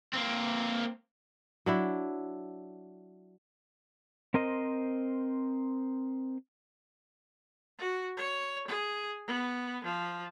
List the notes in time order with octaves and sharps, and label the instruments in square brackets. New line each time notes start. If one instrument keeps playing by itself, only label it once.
[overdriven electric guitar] A#3 C4
[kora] F#3 D4 E4
[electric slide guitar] C4 A#4 C5 D#5
[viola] F#4
C#5
G#4
B3
F3